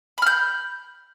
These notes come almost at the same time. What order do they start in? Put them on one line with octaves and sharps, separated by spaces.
B5 F6 G6